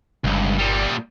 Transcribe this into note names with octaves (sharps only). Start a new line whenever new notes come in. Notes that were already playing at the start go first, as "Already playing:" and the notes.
G1 C#2 G2
A#2 G3